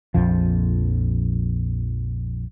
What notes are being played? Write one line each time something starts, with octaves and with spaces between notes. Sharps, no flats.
A#1 F2 F3